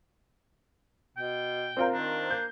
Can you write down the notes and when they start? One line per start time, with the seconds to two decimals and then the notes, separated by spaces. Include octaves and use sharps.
1.17 B2 G5
1.77 A#2 C4 F4 A#4
1.93 D#3 D4
2.30 A#3 G6